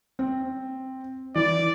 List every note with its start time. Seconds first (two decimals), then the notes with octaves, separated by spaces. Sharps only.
0.19 C4
1.35 E3 D5